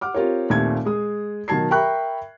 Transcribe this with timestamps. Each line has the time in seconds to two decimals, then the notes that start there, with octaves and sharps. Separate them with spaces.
0.01 F#5 D6 F6
0.14 C4 F4 G4 A#4 C#5
0.50 D#2 A#2 A3 C4 G4 G#6
0.85 G#3 G#4 D#6
1.48 B2 D#3 F#3 A5 G#6 C7
1.71 A#4 E5 G5 B5 C#6 F#6